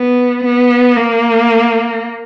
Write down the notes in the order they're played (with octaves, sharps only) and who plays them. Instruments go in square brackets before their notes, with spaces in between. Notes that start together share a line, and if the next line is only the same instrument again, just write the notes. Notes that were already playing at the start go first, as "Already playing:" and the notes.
Already playing: [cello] B3
B3
A#3